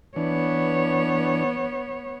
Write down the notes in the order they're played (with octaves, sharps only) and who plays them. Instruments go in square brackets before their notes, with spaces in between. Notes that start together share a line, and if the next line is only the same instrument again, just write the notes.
[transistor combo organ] E3 D4 [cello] B3 C#5